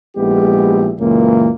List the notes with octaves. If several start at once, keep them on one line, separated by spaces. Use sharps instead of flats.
A#1 G#3 B3 E4 G4
C#2 F#2 A#2 E3 A#3